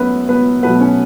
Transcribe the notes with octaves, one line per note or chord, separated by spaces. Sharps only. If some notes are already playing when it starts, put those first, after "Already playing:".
Already playing: F#2 A3 B3 C#4 B4
B3 B4
B2 F#3 A3 B3 B4
C#4 C#5